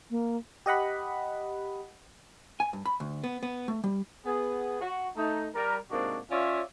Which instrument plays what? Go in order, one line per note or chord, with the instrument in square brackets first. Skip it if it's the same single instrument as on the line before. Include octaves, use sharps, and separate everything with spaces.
[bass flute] A#3
[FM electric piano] G4 D#5 F#5 B5
[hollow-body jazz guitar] G#5
G2
B5
D2
B3
B3
A3
G3
[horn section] B3 G#4
F#4
A3 D#4
G3 A#4
G#2 C3 A#3 C4 D4 F#4
C#4 F4 C#5 D5 E5 F5